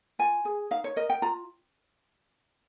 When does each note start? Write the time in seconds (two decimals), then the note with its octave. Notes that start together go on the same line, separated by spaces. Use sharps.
0.19 F4 G#5
0.45 G#4
0.71 D#4 F5
0.84 C#5
0.96 A#4 D#5
1.10 G5
1.22 F4 A#5